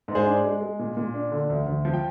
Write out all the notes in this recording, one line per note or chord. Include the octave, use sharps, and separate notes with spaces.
G#2
G#4 C5
D4
G#3
G#3
A#2
A#2
D4
D3
D2
D2
F3
G5